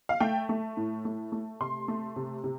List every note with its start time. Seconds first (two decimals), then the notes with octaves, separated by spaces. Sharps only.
0.09 F5
0.20 A3 G5
0.49 A3
0.77 A2
1.05 A3
1.32 A3
1.60 C3 C6
1.88 A3
2.16 C3
2.44 C3